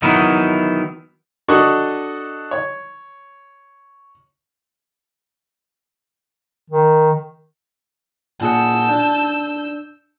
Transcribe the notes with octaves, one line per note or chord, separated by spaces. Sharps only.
D#3 E3 F#3 B3 D#4 E4
D4 F#4 A4 D#5 C#6
C#5
D#3
A#2 G#4 F#5 A5 E6 G6
D4